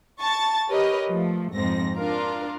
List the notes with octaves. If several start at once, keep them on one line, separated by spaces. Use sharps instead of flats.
A5 C#6 A6
G4 A#4 B4 C#5 D#5
F3 A3
F2 G#2 C4 A#6
D4 F4 A#4